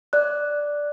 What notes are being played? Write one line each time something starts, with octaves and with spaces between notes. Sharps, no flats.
D5 F#6